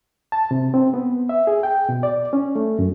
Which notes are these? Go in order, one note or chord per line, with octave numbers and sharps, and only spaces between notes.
A5
C3
C4
B3
E5
G#4
G5
B2
D5
C#4
A3
F#2